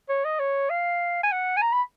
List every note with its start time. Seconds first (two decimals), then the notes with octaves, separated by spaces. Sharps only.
0.09 C#5
0.25 D#5
0.39 C#5
0.70 F5
1.23 G#5
1.32 F#5
1.57 G#5
1.62 A#5
1.72 B5